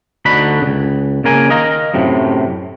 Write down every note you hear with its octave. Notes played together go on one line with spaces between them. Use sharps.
D2 D3 D#4 F#4 B5
C#2 C#3
C#3 A#3 A#4 G#5
A#4 D#5 F5 A#5
F#2 A2 C3